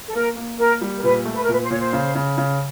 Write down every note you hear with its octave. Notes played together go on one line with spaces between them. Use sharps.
A4
A#3 A#4
A#3
A#3 A#4
G3
A#4
A#2 B4
A3
B4
A#4
A#2 B4
C5
A#2 C#5
C5
C#3
C#3
C#3